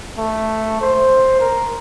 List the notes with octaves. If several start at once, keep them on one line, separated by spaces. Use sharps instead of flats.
A3
C5
A#4